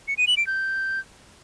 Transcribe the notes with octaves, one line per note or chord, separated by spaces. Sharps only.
C#7
D#7
F#7
D7
G6